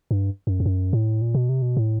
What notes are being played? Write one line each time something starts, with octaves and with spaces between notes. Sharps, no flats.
G2
F#2
F2
F#2
A2
A#2
B2
C3
B2
A2